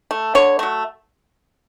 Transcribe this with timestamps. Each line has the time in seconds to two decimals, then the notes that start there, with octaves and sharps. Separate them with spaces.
0.11 A3
0.35 D3 C#5
0.59 F#3 A3